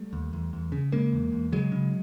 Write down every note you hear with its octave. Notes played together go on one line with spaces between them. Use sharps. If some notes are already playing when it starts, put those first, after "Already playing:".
Already playing: G3 A3
D#2
E2
E2
C#3
C#3 G#3 A#3
E2
E2
C#3 F#3 G#3
C#3